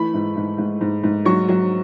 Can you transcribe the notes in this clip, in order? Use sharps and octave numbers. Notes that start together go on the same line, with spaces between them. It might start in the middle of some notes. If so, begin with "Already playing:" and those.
Already playing: E3 A3 B5
G#2
G#2
G#2
G#2
G#2
F#3 C#6
F#3